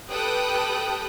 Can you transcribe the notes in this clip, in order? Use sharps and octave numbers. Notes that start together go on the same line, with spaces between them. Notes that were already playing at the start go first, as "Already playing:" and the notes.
G4 A4 B4 G5 D#6 F#6